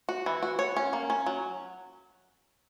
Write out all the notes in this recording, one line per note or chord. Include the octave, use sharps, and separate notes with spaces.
F#4
E3
F#4
C#5
C#4
A#3
C#4
F#3